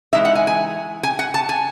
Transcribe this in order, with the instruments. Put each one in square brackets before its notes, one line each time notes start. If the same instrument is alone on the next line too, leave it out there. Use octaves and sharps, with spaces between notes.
[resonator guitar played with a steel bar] E3 G#3 D#4 E5
F#5
G#5
G#5
G#5
F#5
A5
G#5